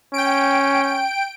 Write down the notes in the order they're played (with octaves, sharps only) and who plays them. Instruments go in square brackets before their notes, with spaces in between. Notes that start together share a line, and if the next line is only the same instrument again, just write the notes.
[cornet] C#4 [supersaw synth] G5 D7